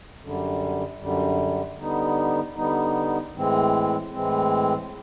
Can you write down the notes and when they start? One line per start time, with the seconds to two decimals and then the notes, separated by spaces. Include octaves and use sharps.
0.21 F#2 D3 G3
1.00 F#2 D3 G3
1.77 D3 G3 B3 D#4
2.55 D3 G3 B3 D#4
3.33 A2 E3 G#3 C4
4.12 A2 E3 G#3 C4